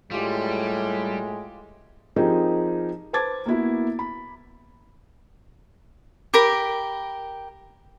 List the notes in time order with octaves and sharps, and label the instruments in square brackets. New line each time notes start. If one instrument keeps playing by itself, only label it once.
[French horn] A2 [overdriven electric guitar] G3 [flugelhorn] G#3 [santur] F4 G4
[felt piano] F3 C4 D#4 G4 G#4 A#4
B4 C5 A5 D6 G#6 A6
A#3 B3 E4 F#4
B5
[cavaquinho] G4 A#4 B5